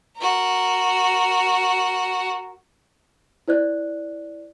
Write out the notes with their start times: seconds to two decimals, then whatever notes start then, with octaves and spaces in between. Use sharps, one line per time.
0.18 F#4 A#4
3.48 E4 C5 D5 F#6